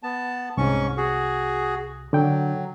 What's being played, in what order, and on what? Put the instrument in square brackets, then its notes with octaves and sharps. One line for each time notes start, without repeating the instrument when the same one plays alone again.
[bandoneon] B3 A5
[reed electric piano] C2 [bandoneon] G#2 C#4 C#6
[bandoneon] F#4 G#4
[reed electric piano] D3 G5 [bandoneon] F#3